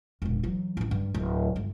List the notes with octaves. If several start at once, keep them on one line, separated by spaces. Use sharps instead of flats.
E1 A#1
E3 F#3
A1 E4
G2
D1
G1